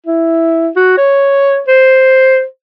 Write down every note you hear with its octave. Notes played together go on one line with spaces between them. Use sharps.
E4
F#4
C#5
C5